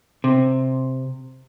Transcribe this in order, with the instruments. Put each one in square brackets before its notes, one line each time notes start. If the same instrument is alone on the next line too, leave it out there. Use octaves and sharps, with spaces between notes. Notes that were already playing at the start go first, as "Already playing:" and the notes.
[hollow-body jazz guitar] C3